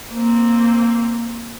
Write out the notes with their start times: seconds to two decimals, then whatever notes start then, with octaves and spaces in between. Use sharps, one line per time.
0.12 A#3 C4